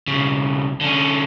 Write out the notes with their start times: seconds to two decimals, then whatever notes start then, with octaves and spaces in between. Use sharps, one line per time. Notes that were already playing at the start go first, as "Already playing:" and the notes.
0.08 B1 C#3
0.81 D3 C#4